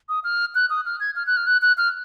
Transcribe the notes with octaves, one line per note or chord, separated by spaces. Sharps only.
D#6
F6
F#6
D#6
F6
G#6
F6
F#6
F6
F#6
F#6
F6